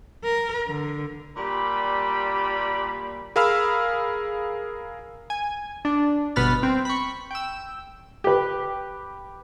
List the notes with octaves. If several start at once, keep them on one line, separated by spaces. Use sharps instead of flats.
A#4
D3
A#2 G3 G4 B5
G#4 A#4 F5 B5 E6 F6
G#5
D4
G1 B2 B3 B5 F6 A6
C4
B5 C#6
G5 E6
G4 B4